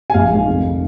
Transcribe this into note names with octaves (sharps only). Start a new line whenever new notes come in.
G#5
A#1 F5
G#2 D#3
F1
D#3